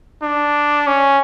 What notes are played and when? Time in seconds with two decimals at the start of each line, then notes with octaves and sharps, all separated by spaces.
0.23 D4
0.87 C#4